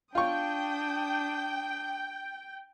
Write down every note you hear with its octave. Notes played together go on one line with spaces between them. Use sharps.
D4 F4 G5 C#6 D#6